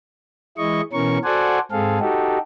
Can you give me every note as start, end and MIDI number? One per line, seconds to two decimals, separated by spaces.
0.58 0.81 52
0.58 0.81 56
0.58 0.81 64
0.58 0.81 75
0.58 0.81 85
0.93 1.18 47
0.93 1.18 52
0.93 1.18 61
0.93 1.18 70
0.93 1.18 85
1.24 1.59 66
1.24 1.59 69
1.24 1.59 72
1.24 1.59 74
1.24 1.59 78
1.24 1.59 80
1.71 1.99 44
1.71 1.99 60
1.71 1.99 68
1.71 1.99 69
1.71 1.99 77
2.00 2.38 63
2.00 2.38 66
2.00 2.38 67
2.00 2.38 69